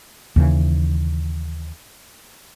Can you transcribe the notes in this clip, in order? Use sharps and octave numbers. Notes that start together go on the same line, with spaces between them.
D#2 C#3 E3